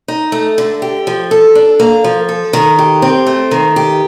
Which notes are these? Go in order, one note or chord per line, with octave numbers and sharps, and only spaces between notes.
D#4
A3
D3
G4
F3
A4
D4
A#3
F3
A4
D#3
G4
C4
A3
D#3
G4